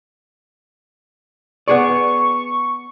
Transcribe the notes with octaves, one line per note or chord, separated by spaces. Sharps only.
B3 G#4 D5 C#6